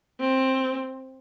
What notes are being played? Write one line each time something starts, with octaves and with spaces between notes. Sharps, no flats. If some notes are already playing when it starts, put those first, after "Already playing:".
C4